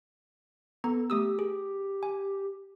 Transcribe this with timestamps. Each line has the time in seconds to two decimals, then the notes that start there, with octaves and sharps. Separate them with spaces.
0.84 B3 A4 A#5
1.10 A3 G4 D#6 E6
1.39 G#4
2.03 G#5